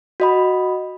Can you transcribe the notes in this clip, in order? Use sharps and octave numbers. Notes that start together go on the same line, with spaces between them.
F#4 D#5 B5